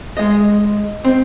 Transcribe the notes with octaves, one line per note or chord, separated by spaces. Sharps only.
G#3 D#5
C4